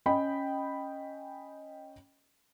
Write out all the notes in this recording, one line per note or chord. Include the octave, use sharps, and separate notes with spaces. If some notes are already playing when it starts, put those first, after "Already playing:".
C#4 D#5 G5 B5